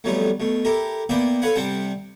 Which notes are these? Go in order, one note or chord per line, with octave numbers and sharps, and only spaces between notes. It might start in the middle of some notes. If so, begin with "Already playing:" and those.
F2 F#3 G3 A3 B3 C#5
B2 A3
E4 G4 A4 A#4
A#3 B3 E4 D5 E5 G5
A4 B4 C#5 F5 F#5 B5
C3 G3 C4 F#5 G5 A5